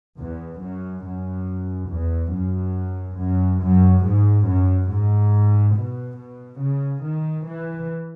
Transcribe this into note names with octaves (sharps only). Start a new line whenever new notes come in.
E2
F#2
F#2
E2
F#2
F#2
F#2
G#2
F#2
G#2
B2
B2
C#3
D#3
E3